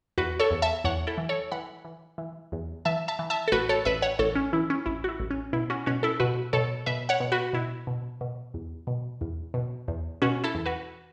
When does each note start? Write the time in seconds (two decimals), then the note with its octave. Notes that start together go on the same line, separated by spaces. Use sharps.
0.18 E2 F#4 B4
0.40 A4 C#5
0.51 E2
0.62 E5 A5
0.84 E2 C#5 F#5
1.07 E4 A4
1.18 E3
1.29 A4 C#5
1.52 E3 F#5 B5
1.85 E3
2.18 E3
2.52 E2
2.85 E3 E5 A5
3.08 E5 A5
3.19 E3
3.30 E5 A5
3.48 A4
3.52 A1 F#4 B4
3.69 A4 C#5
3.85 A1 B4 E5
4.02 C#5 F#5
4.19 A1 A4 C#5
4.35 C#4
4.53 E3 E4
4.70 C#4
4.86 A1 E4
5.04 F#4
5.09 E4
5.20 A1
5.30 C#4
5.53 B2 E4
5.70 C#4 F#4
5.86 B2 C#4 F#4
6.03 E4 A4
6.20 B2 F#4 B4
6.53 B2 A4 C#5
6.86 B2 B4 E5
7.09 C#5 F#5
7.20 B2
7.32 F#4 B4
7.53 B2 E4
7.87 B2
8.21 B2
8.54 E2
8.87 B2
9.21 E2
9.54 B2
9.88 E2
10.22 B2 C#4 F#4
10.44 E4 A4
10.55 E2
10.66 F#4 B4